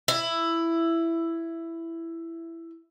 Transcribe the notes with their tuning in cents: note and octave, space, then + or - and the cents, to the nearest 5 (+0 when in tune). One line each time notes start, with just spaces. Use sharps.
E4 +10